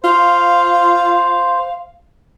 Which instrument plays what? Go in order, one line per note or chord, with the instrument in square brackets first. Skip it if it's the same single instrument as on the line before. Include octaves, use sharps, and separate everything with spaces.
[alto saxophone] F4 [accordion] C5 [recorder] F5